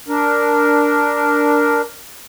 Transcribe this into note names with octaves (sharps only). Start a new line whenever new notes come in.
D4 A#4